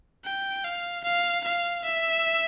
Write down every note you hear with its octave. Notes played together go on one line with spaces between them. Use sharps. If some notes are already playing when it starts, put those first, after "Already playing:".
G5
F5
F5
F5
E5